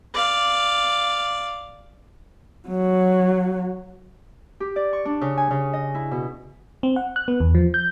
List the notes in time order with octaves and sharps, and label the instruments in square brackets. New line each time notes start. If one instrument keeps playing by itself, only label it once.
[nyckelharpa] D5 F5
[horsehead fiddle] F#3
[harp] G4
D5
C#6
D4
C#3
G#5
C#3
D#5
E4
B2
[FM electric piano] C4
F#5
F#6
B3
E2
F3
G6